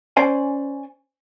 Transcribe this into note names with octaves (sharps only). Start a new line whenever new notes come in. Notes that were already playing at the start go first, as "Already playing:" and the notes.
C#4 C5 D5 G#5